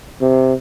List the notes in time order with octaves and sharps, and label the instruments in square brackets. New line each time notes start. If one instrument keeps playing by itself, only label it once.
[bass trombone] C3